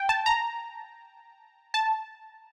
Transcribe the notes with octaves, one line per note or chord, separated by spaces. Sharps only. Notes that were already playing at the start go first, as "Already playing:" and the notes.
Already playing: G5
A5
A#5
A5